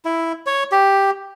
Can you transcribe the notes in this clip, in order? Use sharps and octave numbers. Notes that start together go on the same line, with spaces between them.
E4
C#5
G4